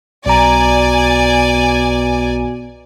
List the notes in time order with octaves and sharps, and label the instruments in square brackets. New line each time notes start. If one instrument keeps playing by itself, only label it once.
[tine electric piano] B1 A#5 [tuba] B2 [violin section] D5 G#5